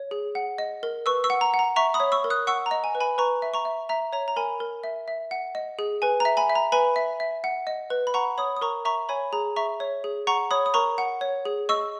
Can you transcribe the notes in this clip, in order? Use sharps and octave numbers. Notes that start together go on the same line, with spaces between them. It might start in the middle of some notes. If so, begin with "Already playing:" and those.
Already playing: C#5
G#4
F#5
D#5
A#4
B4 C#6 E6
C#6 E6
F#5
A#5
F#5
A#5
E5 A#5 C#6
B5 D#6
C#5
C#6 E6
A#4
D#6 F#6
F#5 C#6 E6
A#5
D#5
G#5
B4
G#5 B5
B4 A#5 C#6
E5
A#5 C#6
E5
E5 A#5
C#5 A#5
A#5
A#4 G#5 B5
A#4
E5
E5
F#5
D#5
G#4
B4 G#5
A#5
E5
G#5 B5
E5
A#5
B4 G#5 B5
E5
E5
F#5
D#5
B4
B5
F#5 A#5 C#6
C#5 B5 D#6
D#6
A#4 A#5 C#6
E5 A#5 C#6
C#5 G#5 B5
G#4 A#5
E5 A#5 C#6
C#5
G#4
F#5 A#5 C#6
C#5 B5 D#6
D#6
A#4 A#5 C#6
F#5
C#5
G#4
D#5 C#6 E6